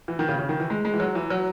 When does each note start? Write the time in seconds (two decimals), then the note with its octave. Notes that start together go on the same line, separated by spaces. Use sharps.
0.08 E3
0.19 D#3
0.29 C#3
0.39 C#3
0.49 D#3
0.60 E3
0.70 G#3
0.85 G#3
0.94 E3
1.00 F#3
1.15 E3
1.30 F#3